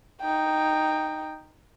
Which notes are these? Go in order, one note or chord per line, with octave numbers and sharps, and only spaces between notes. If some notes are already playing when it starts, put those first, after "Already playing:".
D#4 G5